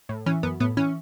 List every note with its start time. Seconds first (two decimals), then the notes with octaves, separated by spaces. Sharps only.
0.09 A2
0.26 E3 C#4
0.43 F#2 B3
0.60 A2 B3
0.77 E3 C#4